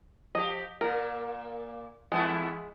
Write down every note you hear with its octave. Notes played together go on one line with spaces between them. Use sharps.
F3 G4 D#5
A#2 A#3 A#4
E2 G#3 B3 E4